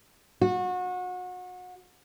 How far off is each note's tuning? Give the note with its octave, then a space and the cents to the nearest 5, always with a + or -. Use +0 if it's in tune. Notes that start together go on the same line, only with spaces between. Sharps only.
F#4 -30